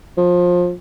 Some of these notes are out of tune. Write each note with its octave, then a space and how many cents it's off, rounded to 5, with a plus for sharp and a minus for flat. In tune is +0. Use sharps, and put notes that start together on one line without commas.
F3 +25